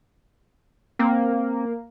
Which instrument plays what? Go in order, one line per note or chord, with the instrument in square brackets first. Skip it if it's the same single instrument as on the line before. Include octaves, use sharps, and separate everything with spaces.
[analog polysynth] A#3 [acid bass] C4